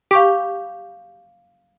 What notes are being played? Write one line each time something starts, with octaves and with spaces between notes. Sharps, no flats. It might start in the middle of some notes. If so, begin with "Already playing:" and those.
G4 F5 C#6 D6